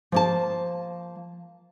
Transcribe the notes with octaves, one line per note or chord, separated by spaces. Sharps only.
F3 A#3 A5